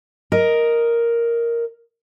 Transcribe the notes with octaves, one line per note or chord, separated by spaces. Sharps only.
A#4 D#5